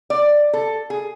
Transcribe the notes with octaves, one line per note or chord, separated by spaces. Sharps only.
D5
A4
G#4